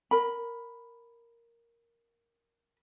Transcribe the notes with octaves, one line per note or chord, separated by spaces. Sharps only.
A#4 B5